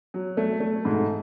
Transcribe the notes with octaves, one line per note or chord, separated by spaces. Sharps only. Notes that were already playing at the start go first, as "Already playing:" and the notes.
F#3
A3
A3
G#2